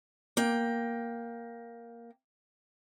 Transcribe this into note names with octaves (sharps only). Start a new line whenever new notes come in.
A#3 G5